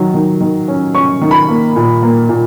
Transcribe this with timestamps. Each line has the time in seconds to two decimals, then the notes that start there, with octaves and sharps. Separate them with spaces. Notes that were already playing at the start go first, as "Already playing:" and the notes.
Already playing: D#3 F#3
0.14 D#3
0.41 D#3
0.68 C#4
0.94 C#4 C#6
1.22 D#3
1.31 B5
1.48 A#3
1.76 A#2
2.03 A#3
2.29 A#2